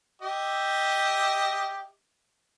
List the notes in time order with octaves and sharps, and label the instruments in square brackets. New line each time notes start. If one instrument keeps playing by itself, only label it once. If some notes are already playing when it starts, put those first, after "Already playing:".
[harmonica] G4 D#5 E5